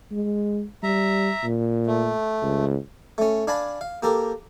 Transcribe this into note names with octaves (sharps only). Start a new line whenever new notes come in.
G#3
G3 E5 A#5
A#2
A3
C#2
A3 C#4
D4 F5 G#5 A5 B5
F5
A#3 G4 A4 A#4